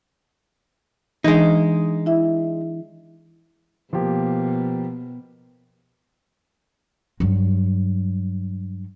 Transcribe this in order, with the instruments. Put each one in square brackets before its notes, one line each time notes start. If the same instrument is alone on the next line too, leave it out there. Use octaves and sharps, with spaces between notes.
[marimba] E3 D4 [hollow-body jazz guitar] G#3 D#4
[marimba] E4 E5
[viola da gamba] B2 [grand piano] F3 A#3 G4
[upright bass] G2 F#3